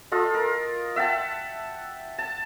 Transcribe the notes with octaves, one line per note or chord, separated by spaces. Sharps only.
F4 A4 D#5
A#4
E5 F#5 G5 A5
A5